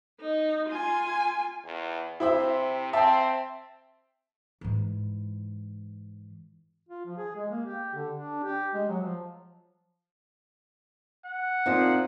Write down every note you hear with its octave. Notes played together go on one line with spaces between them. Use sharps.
D#4
F4 G#5
E2
C3 E4 C5 E5
C4 E5 G5 A5
G#2 E3
F4
F3
G#4
G#3
A#3
G4
D3
D4
G4
G#3
F#3
F3
F#5
A#2 F3 C4 D#4